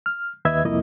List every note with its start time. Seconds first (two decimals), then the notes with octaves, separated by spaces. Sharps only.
0.06 F6
0.45 D#2 B4 D#5 E5 G#6
0.65 C2 F2 A#3 E4 D#5